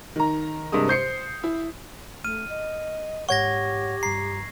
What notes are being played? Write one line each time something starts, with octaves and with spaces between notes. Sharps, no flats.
D#3 A#5
G2 C3 G#3 A#4 D#6
C5 G6 C7 C#7
E4
A3 F6 D#7
D#5
G#2 G4 C#5 F#5 C#6 G#6 A#6
G2 A#5 C7